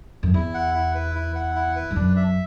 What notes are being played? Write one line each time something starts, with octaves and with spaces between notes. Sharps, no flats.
F#2
E2 E4
F#5
E4
B4
E4
F#5
E4
B4
G2
F#2 D4
E5